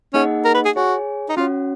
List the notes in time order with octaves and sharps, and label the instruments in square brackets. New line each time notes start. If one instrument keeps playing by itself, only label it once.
[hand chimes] A#3 D#4 G#4 D#5 F#5 [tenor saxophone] C#4
[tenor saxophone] A#4
B4
G#4
[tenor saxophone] F#4 [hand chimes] G#4 C#5 G#5
[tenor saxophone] D#4
[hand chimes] C#4 F#4 C#5 F#5 [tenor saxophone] F4